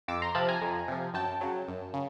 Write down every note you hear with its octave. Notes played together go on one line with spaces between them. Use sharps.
F2 D6 E6
A#5 C6
C3 F3 A5 B5
G#5 A#5
F2
C3 F3
F#2 G5 A5
C#3 F#3
F#2
C#3